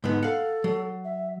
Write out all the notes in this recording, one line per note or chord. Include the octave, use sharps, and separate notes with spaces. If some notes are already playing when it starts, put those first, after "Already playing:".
G#2 D3 B3 D#4
A4 F5 F#5
F#3
E5